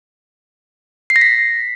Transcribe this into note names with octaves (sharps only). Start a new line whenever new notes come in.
C7
A#6
B6